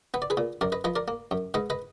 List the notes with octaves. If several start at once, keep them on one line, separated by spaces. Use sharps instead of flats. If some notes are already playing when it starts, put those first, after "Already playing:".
B3 B4
D5
G#4 B4
A#2
F#2 A#4 D5
B4 D#5
F3 B4 D#5
A#4 D5
A#3
F#2
G#2 B4 D#5
B4 D#5